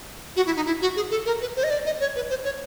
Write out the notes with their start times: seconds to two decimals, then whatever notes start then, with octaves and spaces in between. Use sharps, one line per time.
0.36 F#4
0.46 E4
0.56 D#4
0.66 E4
0.81 F#4
0.96 G#4
1.11 A4
1.26 A#4
1.41 B4
1.56 C5
1.63 D#5
1.70 D5
1.86 D#5
2.00 C#5
2.16 B4
2.30 C5
2.44 C#5